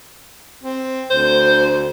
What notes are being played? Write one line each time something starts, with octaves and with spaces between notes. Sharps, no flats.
C4
D2 C5